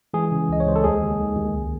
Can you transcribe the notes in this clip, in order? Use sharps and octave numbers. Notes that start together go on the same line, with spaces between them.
E3 G#3 G#4
C#3
C#2 D#5
C#5
C#2 C5
A4
D#2 G#3 G#4
D#2
D#3
D#2
C#2